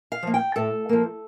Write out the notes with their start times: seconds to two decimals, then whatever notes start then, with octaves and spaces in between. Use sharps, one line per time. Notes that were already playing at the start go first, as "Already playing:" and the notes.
0.12 F5
0.23 F3 A#3
0.34 G5
0.56 A2 A4
0.89 F3 A#3